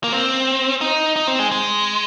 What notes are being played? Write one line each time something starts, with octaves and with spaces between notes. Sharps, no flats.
A#3
C4
D#4
D#4
C4
G#3
G#3